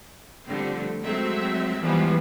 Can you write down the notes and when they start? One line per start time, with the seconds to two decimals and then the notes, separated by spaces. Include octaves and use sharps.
0.46 D3 F3 G3 A3 C4
1.01 F#3 G#3 A3 C4 E5
1.81 E3 F3 G3 G#3 B3